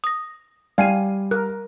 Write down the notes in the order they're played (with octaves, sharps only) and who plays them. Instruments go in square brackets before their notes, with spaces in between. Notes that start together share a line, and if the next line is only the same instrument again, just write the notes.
[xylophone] D#6 A#6
[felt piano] G3 [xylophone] D5 G5 D#7 [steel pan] F5 G#5
[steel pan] A#4 [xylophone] F#6